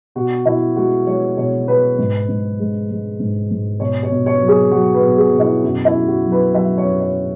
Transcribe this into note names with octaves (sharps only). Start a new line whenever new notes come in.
B2 F#4
B2 E4
G#3 F#4
G#3 C#5
B2 C#5
B2 B4
G#2
G#2
G#3
G#3
G#2
G#2
B2 C#5
C#5
B2
C#5
F#3
G#4
F#3 F#4
B4
B2
G#4
B2
E4
F#2 F#4
E4
F#2
F#4
F#3
B4
F#3 E5
C#5
F#2
C#5